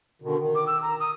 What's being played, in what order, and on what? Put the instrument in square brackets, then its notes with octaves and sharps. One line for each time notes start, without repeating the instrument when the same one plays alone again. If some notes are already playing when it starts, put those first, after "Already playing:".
[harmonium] B2 D3 D#3
D#3
[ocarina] D6
E6
A#5
D#6